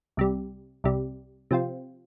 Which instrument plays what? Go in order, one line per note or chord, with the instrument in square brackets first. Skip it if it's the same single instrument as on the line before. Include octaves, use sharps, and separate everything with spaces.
[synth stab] C2 C3 G3
C2 C3 G3
C3 F3 C4 F4